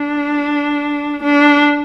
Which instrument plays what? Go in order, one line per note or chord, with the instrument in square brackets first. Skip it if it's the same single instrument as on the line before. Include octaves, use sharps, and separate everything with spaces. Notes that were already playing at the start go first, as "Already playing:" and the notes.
Already playing: [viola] D4
D4